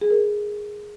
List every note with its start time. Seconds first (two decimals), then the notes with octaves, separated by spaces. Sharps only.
0.01 G#4
0.10 A#4